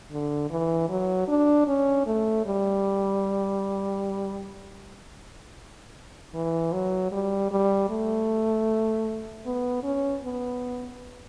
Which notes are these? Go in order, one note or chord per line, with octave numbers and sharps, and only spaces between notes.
D3
E3
F#3
D4
C#4
A3
G3
E3
F#3
G3
G3
A3
B3
C#4
B3